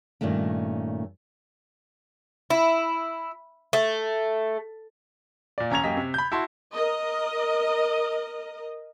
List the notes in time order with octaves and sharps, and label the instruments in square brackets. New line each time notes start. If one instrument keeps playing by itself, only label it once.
[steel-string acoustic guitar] G2 A#2 D#3 A3 C#4
[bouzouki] E4
A3
[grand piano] A#2 D5
E1 C#4 A#5 G#6 F7
F#2 A#3 G4 D#5 B6
C3
B5 G6
E4 F#4 A5 C6
[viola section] A#4 D#5